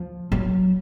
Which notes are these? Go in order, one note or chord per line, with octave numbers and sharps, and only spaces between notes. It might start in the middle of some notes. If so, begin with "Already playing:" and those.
Already playing: F3
F#3